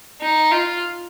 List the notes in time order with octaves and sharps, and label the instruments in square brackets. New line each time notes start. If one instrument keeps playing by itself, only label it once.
[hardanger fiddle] D#4
F4